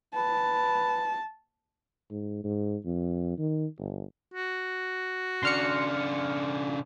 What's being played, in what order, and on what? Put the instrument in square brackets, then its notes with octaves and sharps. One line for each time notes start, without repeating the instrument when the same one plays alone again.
[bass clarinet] B4 [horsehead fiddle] A5
[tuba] G#2
G#2
F2
D#3
G1
[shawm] F#4
[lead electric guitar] C#3 D4 [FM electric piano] C6 F6 C#7